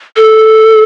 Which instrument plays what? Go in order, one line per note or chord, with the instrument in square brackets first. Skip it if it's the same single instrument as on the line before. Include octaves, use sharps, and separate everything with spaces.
[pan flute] A4